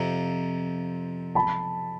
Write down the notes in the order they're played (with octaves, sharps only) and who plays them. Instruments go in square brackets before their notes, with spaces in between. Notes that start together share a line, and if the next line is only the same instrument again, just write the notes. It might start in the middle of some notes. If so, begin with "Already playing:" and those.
Already playing: [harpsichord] F2 C3 F3 [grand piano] A#5
[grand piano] A5 B5